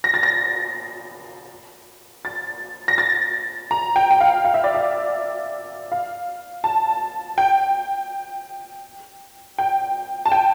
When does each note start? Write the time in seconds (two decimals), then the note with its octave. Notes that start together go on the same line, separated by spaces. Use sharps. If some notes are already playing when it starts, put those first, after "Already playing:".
0.04 A#6
0.14 A6
0.23 A#6
2.25 A6
2.88 A#6
2.98 A6
3.71 A#5
3.96 G5
4.11 G5
4.20 F5
4.45 F5
4.54 E5
4.64 D5
4.74 E5
5.92 F5
6.64 A5
7.38 G5
9.58 G5
10.25 A5
10.32 G5